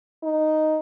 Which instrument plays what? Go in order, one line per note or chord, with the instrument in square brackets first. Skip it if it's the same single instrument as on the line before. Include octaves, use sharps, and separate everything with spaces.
[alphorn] D#4